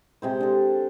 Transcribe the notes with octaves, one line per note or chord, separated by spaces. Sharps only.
C3 G#3 C5
D4 A4